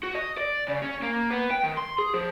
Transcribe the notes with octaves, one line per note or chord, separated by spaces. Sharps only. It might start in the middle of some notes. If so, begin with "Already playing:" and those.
F#4
D#5
D5
C#3
C#4
A#3
B3
G5
D#3
C6
G#4
F3